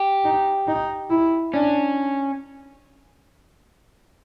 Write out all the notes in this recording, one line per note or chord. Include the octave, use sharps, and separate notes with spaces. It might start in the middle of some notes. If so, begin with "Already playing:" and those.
Already playing: G4
D#4
D#4
E4
C#4 D4